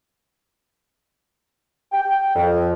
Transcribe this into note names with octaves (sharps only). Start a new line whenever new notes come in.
G5
F2